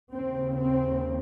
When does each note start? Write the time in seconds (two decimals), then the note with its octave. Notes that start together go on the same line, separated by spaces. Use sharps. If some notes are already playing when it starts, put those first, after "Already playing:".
0.13 D#2 C#3 C4
0.59 C4